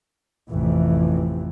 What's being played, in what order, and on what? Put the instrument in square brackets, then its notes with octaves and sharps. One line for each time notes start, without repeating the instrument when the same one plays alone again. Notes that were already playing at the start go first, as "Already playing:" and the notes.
[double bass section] A1 F2 C3 E3